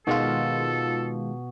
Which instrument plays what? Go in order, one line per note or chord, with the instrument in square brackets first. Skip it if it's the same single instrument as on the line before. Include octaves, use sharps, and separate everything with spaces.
[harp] B2 [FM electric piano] D#3 G#3 F4 [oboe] A4